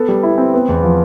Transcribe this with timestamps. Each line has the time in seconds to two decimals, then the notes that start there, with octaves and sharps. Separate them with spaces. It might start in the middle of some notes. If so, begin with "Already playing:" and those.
Already playing: B3 A4
0.08 G3
0.23 E4
0.38 C4
0.54 B3
0.69 E2
0.83 F3